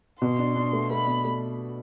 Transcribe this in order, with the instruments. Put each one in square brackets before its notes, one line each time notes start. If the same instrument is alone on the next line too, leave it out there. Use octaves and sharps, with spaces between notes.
[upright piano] B2 [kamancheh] C6
[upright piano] D4
D4
A3
[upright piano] A3 [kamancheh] B5
[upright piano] B2
A3